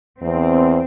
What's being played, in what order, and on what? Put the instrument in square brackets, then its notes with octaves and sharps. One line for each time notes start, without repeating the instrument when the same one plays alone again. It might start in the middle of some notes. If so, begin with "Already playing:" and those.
[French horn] E2 [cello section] C4